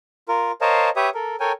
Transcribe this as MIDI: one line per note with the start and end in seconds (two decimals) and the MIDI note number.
0.28 0.52 65
0.28 0.52 70
0.61 0.90 70
0.61 0.90 72
0.61 0.90 73
0.61 0.90 75
0.61 0.90 77
0.61 0.90 81
0.96 1.10 67
0.96 1.10 71
0.96 1.10 73
0.96 1.10 76
0.96 1.10 87
1.14 1.36 69
1.14 1.36 70
1.40 1.52 69
1.40 1.52 70
1.40 1.52 73
1.40 1.52 79
1.40 1.52 80